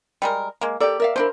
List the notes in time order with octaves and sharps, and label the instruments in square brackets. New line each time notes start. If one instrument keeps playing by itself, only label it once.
[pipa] G3 G#3 A#4
G#3 A#3
[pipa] A#3 D5 [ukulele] G4 A4
[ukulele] A#4 E5 F5
[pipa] F3 D4 E4 [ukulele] A#4 C5